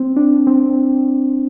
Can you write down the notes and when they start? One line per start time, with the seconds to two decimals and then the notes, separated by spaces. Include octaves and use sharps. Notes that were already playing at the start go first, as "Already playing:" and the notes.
Already playing: C4
0.16 D4
0.47 C4